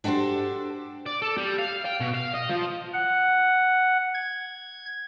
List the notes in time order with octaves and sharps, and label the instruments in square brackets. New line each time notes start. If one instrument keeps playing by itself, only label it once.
[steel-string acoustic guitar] D4 F#4 G4 A4 C5
[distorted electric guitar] D5
A4
G3
F5
G5
B2
F5
D#5
F3
[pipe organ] F#5
G#6